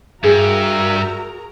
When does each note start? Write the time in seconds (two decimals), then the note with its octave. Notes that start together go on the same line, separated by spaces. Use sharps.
0.24 G2 F#4 G#4 A#4 E5 A#5